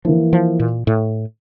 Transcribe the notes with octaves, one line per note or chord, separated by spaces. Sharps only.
E3 F3 A#3 E4
F3
A#2
A2